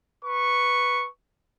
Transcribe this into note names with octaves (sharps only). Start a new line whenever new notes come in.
B4 C#6